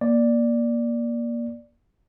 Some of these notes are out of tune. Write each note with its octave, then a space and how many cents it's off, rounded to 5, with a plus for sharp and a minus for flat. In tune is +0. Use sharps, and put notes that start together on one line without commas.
A#3 +20 D5 +0